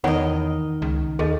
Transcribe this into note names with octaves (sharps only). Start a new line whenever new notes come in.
E2 D#3 A#4 C#5 D#5 F#5 B5
C#2
D#2 G#4 A4 D#5